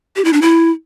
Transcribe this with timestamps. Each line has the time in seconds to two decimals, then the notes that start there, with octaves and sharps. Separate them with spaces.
0.16 G4
0.25 E4
0.33 D4
0.42 E4